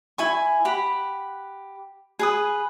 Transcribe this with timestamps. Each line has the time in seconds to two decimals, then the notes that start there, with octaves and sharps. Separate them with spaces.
0.18 E4 G#5 C#6
0.65 G4 F#5 B5
2.19 G#4 B4 D#6